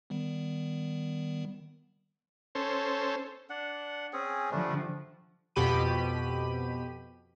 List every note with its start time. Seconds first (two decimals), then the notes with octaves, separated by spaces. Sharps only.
0.10 D#3 G3 B3
2.55 C#4 A4 C5
3.50 D4 F#5
4.13 C4 C#4 G#4
4.51 D3 F3 G3 A3 D4
5.56 F2 B2 G4 B5 D#7